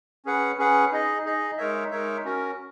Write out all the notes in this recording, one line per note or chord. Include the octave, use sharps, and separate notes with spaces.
C#4 G#4 B4 F#5
C#4 G#4 B4 F#5
D#4 G#4 D#5
D#4 G#4 D#5
G#3 D#4 A#4 C#5 E5
G#3 D#4 A#4 C#5 E5
C#4 F#4 A#4